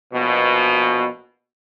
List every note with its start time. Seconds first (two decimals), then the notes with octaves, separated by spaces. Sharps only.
0.13 A#1 B2